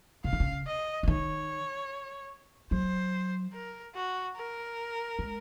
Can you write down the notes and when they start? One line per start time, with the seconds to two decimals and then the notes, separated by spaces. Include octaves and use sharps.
0.24 C#3 F5
0.33 D#3
0.40 C#3
0.67 D#5
1.03 F3
1.08 D#3 C#5
2.71 F#3 C5
3.54 A#4
3.95 F#4
4.37 A#4
5.19 G#3